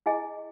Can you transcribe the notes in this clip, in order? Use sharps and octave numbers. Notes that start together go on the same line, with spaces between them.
E4 G#4 D#5 G#5